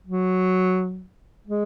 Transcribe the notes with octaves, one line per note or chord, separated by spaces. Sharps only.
F#3
G#3